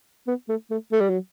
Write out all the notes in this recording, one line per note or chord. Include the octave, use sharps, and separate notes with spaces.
B3
A3
A3
A3
G3
F#3